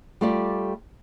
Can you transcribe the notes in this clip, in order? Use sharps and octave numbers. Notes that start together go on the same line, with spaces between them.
G3 A3 F4 G4 D5